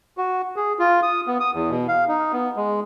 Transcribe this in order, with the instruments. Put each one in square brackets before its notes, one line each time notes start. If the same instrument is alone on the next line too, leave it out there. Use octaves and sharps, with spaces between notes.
[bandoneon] F#4
G#4
F4
D#6
B3
D#6
E2
B2
F5
D#4
B3
G#3